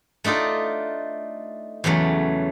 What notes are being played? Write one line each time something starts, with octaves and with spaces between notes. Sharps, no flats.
A3 D4 D#4 F4 A4
E2 C#3 F#3 A3